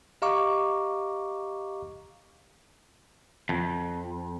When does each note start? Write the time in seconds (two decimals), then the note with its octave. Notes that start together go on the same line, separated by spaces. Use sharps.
0.22 G4 D#5 F5 A#5 C#6 D6
3.49 F2